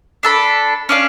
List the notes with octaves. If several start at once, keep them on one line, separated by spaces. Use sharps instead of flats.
D4 A4 B5
C#4 D4 F5